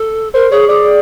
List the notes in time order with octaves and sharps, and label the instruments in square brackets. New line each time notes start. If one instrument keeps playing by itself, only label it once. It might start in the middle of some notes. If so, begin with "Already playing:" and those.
Already playing: [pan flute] A4
[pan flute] A#4 [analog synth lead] C5
[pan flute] G#4 [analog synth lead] C#5
[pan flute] G#4 [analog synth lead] D5